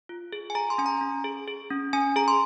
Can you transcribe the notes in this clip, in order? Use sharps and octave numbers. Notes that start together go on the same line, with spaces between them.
F4
G#4
G#5
G#4 A#5
C6
C#4 G#5
A#5
C#4
G#4
G#4
C#4
C#4 G#5
G#4 A#5
C6